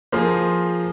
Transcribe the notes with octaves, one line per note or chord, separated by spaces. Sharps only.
F3 A#3 F4 G#4 C5